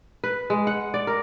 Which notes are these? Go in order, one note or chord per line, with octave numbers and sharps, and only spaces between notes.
B4
G#3
F#5
D5
A#4